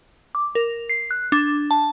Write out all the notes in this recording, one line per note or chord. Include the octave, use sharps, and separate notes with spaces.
D6
A#4
C7
F#6
D4
A5